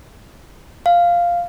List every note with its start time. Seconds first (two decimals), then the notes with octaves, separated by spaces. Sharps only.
0.86 F5